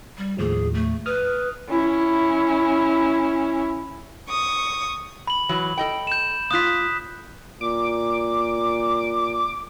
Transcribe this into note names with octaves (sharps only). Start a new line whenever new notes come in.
G3
D#2 A2 F3 G#4
A3
B4 D#6 F6
C#4 E4
C#6 D#6
B5 F#7
E3 F#3
A4 D#5 G5
G6 E7
A#3 F4 D#6 F#6 B6
A#2 D6